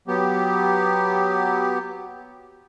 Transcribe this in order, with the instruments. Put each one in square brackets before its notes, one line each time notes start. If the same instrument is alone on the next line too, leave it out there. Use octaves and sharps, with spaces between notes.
[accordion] F#3 B3 G4